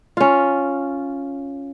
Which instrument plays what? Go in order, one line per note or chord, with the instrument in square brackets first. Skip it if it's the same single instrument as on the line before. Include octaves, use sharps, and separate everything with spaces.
[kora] C#4 F4